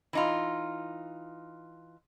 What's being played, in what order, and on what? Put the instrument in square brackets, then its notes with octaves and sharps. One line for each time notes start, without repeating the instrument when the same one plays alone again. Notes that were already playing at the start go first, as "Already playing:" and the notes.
[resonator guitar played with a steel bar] E3 D#4 F4